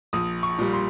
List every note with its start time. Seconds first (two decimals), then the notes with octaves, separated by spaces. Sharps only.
0.13 A#1 D#6
0.43 C#6
0.59 A#2 G3
0.73 C6